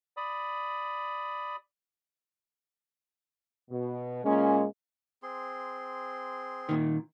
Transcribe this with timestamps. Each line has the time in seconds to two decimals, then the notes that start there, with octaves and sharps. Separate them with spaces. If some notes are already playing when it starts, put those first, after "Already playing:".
0.17 D5 B5 D#6
3.71 B2
4.25 A#2 G#3 A#3 C#4
5.23 C4 G#4 C6
6.69 A#2 D#3